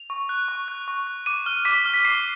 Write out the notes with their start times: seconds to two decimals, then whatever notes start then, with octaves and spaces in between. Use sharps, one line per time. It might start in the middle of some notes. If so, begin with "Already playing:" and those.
Already playing: F7
0.10 C#6
0.29 F#6
0.48 C#6
0.68 F#6
0.88 C#6
1.07 F#6
1.26 D6 D#7
1.46 F6
1.65 D6 B6
1.85 F6
1.94 B6
2.05 D6 C7